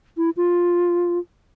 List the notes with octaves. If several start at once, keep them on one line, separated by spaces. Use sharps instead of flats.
E4
F4